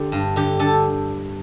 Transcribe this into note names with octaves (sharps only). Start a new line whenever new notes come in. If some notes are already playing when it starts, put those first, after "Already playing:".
Already playing: D3 G4
G2
D3 G4
D3 A4